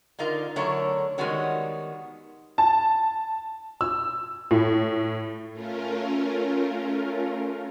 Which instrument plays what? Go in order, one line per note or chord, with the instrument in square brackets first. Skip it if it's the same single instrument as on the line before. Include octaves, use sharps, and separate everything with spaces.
[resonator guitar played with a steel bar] D3 D#4 F4 A#4
D3 F#3 A3 A#4 C#5 E5
D#3 G3 G#3 B3 F#4 C#5
[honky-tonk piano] A5
E6
A2
[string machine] A3 C#4 F4 A#4